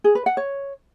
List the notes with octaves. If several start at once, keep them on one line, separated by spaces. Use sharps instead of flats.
G#4
B4
F#5
C#5